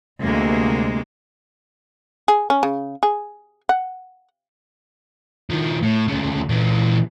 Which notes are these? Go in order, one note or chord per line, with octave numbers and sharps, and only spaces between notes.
D2 C3 G#3 A#3
G#4
C#4
C#3
G#4
F#5
D#3 F3
A2
D2 C#3
A#2 E3